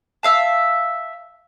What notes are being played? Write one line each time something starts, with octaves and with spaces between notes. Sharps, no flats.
E5 F5 A5